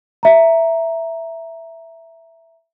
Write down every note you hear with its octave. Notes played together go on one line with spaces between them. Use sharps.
E5 A#5